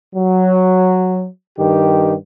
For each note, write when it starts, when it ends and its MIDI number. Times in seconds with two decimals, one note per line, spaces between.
0.15 1.26 54
1.59 2.14 43
1.59 2.14 51
1.59 2.14 67